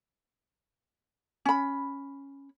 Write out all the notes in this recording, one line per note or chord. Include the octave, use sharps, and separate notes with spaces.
C#4 B5